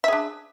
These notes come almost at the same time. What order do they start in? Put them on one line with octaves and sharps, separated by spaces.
E5 G#4 D4